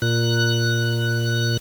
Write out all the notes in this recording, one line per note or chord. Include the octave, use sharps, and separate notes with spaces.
A#2 F#6